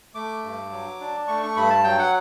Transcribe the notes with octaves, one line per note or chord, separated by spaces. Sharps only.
A3 D6
G2
F#3
D4
A3 C#6
C#6
G2 B5
A5
F#3 G5
F#5